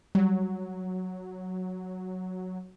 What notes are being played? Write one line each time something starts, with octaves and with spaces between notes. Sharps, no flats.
F#3 G3